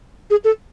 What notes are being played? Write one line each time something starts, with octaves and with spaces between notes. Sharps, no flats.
G#4
A4